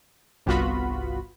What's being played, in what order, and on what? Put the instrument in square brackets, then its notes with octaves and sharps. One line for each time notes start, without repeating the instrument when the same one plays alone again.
[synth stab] G1 C2 B3 F4 F#4 B5